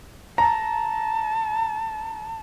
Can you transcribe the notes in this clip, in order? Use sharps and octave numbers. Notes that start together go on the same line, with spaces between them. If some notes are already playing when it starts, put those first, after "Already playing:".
A5 A#5